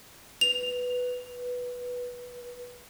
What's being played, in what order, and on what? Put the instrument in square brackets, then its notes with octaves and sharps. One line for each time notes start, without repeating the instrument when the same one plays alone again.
[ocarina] B4 [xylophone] F7